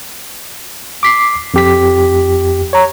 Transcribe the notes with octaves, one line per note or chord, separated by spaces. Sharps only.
D6 B6 C7
F2 G4 B6
C#5 A#5